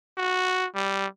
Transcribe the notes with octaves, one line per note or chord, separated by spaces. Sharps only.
F#4
G3